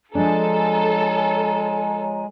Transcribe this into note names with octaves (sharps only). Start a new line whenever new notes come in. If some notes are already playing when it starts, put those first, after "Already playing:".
F3 G#3 D4 A4 C#5 G#5 A#5